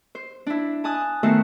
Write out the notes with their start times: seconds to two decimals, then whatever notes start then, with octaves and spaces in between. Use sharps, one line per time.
0.15 C5
0.47 D4 E4
0.84 G#5 A5 D#6 F#6
1.23 D#3 A3 B3 F#4 A4 C5